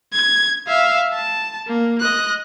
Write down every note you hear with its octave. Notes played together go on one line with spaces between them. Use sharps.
G#6
E5 F5
A5
A#3
D#5 F#6